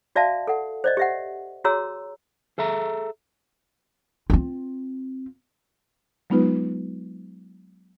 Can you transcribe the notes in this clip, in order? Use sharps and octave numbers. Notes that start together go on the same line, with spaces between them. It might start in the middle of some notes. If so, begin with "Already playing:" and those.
F#4 D5 E5 F5 A5
A4 F#5
C5 D5 D#5
G4 E5 F#5
F#4 G#4 C#5 A#5 C6 E6
G#4 A4 E5 A#5
C4 F4
F#3 G#3 B3 D#4 F4 B4